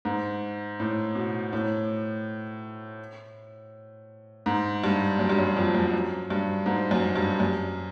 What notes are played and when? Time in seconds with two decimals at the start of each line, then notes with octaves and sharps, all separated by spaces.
0.05 G#2
0.80 A2
1.15 B2
1.53 A2
4.46 G#2
4.84 G2
5.19 F#2
5.29 G2
5.38 F#2
5.57 F2
5.75 F#2
5.93 F#2
6.30 G2
6.66 G#2
6.91 F#2
7.16 G2
7.40 F#2